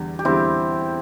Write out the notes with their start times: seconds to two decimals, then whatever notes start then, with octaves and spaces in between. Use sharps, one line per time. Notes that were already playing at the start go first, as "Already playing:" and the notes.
Already playing: E2 D3 G3
0.19 G4
0.25 E2 D3 G3 C4 E4